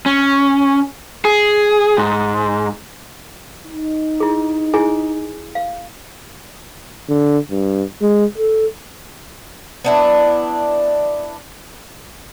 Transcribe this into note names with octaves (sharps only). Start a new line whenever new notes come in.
C#4
G#4
G#2
D#4
E4 G#4
E4 G#4 G#5
F5
D3
G2
G#3
A4
B3 D4 E4